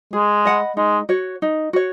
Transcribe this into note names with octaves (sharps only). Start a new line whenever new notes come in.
G#3 G#4
D#5 F#5 B5
G#3 D#4
F#4 C#5
D#4
F#4 C#5